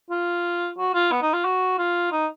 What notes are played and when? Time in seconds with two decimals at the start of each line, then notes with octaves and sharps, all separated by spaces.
0.11 F4
0.78 F#4
0.95 F4
1.12 B3
1.22 D#4
1.34 F4
1.45 F#4
1.79 F4
2.12 D#4